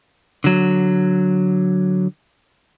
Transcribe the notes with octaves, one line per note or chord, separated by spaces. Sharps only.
D3 F#3